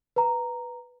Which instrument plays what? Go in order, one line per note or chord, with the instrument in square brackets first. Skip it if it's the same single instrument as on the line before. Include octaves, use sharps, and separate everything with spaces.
[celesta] B4 A#5